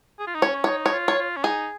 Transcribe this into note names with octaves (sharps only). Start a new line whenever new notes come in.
G#4
F4
D#4
C#4 C#5
D#4 C#5
C#5
F4
C#5
F4
C#4
D#4 G#4